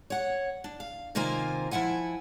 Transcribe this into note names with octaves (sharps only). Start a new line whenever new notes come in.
C#5 F#5
D4
F5
C3 D#3 A#3 F4 C5 G#5
F3 E4 E5 F#5 G#5